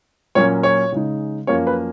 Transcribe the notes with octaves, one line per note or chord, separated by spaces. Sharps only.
A#2 F#3 A#3 C#4 C#5
C#5
C#3 G#3 D#4
F#2 F3 A#3 C#4 C#5
B4